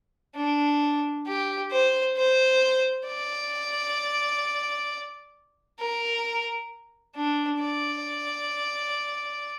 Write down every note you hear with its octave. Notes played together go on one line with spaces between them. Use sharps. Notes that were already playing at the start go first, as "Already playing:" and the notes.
D4
G4
C5
C5
D5
A#4
D4
D5